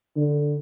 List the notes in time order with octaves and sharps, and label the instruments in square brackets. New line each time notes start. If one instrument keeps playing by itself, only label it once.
[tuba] D3